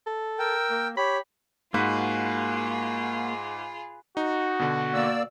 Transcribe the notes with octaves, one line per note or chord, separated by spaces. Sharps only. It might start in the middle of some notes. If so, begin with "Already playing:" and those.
A4
A#4 G5 E6
A#3
G4 C#5 B5
G#2 A#3 F4 F#4 G#4 B4
D#4 F#4
B2 D3
A#3 D5 E6